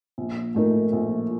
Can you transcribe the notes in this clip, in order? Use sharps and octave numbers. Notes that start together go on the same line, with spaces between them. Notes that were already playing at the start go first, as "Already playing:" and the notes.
A#1
A2 A3 D#4 A#4
A#1